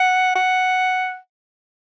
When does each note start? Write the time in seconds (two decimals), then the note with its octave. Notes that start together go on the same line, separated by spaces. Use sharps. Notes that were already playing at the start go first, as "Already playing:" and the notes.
Already playing: F#5
0.35 F#5